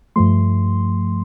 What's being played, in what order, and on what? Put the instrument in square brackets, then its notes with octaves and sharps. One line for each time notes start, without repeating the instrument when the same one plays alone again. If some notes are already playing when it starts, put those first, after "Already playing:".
[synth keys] G2 F3 A3 C6